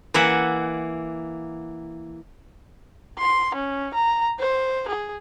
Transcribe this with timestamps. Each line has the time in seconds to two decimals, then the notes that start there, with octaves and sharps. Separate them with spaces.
0.14 E3 A#3 E5 F#5
3.19 C6
3.55 C#4
3.94 A#5
4.40 C5
4.88 G#4